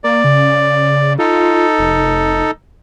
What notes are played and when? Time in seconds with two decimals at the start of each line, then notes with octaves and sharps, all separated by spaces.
0.04 A#3 D5
0.24 C#3
1.19 D#4 F4 A4
1.78 F1